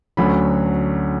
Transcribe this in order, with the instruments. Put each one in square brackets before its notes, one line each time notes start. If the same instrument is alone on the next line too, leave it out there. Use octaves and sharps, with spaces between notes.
[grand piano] D2 D3 F#3 C#4 B5